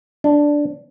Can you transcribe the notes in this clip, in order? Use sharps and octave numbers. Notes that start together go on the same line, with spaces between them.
D4